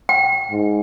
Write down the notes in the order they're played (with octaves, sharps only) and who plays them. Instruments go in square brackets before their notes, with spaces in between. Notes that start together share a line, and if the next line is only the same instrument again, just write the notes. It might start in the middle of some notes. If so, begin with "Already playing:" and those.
[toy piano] G5
[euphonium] G#2